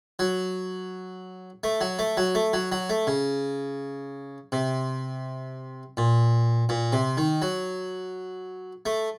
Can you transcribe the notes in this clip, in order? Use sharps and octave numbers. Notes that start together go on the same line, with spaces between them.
F#3
A3
F#3
A3
F#3
A3
F#3
F#3
A3
C#3
C3
A#2
A#2
C3
D#3
F#3
A3